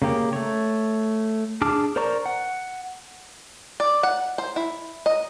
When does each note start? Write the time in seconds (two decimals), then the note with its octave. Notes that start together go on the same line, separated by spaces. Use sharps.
0.02 C#3 A#3 G4
0.33 A3 C#5
1.62 D4 G#4 A5 D6 F6
1.96 A#4 C5 D5 A#5 C#6
2.26 F#5
3.80 D5
4.03 F#5
4.38 C5
4.56 E4
5.06 D#5